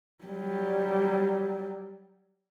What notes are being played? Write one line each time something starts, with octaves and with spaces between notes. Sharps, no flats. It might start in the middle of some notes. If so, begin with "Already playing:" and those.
F#3 G3